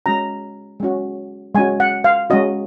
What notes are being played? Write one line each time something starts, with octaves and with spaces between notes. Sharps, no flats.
G#3 C#4 F#4 A#5
G#3 C#4 F#4
G#3 C#4 F#4 G#5
F#5
F5
G#3 C#4 F#4 D#5